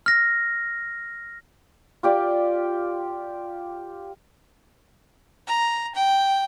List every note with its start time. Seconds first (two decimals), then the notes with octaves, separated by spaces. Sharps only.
0.06 F6 A#6
2.03 F4 G4 D5
5.47 A#5
5.95 G5